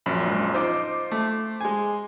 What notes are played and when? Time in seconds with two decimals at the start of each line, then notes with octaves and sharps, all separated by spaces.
0.06 A#1 F#2 B5
0.26 G#2
0.54 D#4 F4 C5 D6
1.11 A3
1.61 G#3 G#5